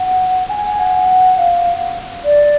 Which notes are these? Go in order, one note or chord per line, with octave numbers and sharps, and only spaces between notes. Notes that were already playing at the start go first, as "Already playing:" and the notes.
Already playing: F#5
G#5
F#5
F5
D5